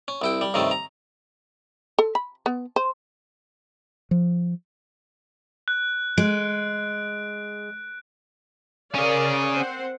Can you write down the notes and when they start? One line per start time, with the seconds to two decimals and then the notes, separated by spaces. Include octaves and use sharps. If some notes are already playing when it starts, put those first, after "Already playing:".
0.08 C#4
0.22 C2 E4 G5
0.41 G3
0.54 G2 C3 D#3 A3 C#4
0.71 A#5
1.99 A4
2.15 B5
2.46 B3
2.76 C5
4.11 F3
5.68 F#6
6.18 G#3 D7
8.95 C#4 G#4 A#4 D5 F5
9.54 C4 C5 F#5